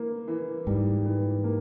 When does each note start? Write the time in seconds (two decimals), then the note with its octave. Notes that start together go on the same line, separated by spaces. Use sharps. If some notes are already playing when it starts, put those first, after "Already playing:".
Already playing: E3 A#3
0.28 E3
0.67 G#2 G3
1.06 E3
1.44 A#3